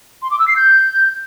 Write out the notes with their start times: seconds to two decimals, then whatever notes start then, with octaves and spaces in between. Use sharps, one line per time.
0.22 C6
0.31 D6
0.39 E6
0.48 C7
0.56 G6